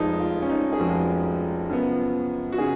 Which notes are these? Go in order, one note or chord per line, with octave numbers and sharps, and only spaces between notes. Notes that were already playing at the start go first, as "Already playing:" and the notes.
Already playing: F1 F2 F3 G#3 D#4
F4
C#4
D#4
G#4
F1 F2 F3 G#3 F#4
F#2 C#3 F3 B3
F#4
C#3 G#4